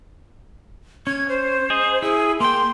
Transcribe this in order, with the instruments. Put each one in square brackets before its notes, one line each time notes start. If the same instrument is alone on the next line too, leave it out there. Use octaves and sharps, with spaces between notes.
[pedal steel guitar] C#4 [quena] G#6
[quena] C5
[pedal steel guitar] G#4 D#5
[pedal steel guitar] E4 [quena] G#4
[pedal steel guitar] A#3 G5 [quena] C6